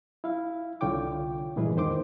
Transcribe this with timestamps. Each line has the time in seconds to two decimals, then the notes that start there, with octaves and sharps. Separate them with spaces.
0.24 E4 F5
0.81 C2 D3 F4 C#5 G5 D6
1.56 G2 A#2 E3 G#3 G#4 B4
1.75 E2 G#2 D#3 C5 C6 D6